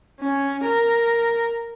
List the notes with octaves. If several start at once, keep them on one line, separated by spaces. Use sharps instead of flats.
C#4
A#4